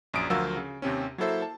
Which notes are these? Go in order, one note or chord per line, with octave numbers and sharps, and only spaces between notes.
A#1 F#2 D#6 D7
D2 F3 F#3 A#4 F5 E6
C#3
D#2 C3 C4 C#4
F#3 A#3 E4 A4 C5 E5
A5